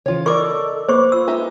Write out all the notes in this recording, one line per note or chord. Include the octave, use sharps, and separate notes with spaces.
C#3 E3 F4 C#5
A4 A#4 D5 D#5 C#6 D6
A#3 B4 C5 C#6 D6
F4 E6
G#3 D#4 E5